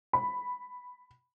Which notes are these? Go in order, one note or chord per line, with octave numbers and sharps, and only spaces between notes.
B5